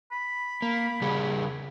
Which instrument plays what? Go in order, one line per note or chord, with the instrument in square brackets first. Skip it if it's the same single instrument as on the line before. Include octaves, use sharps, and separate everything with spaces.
[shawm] B5
[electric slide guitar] A#3
C#3 G3 G#4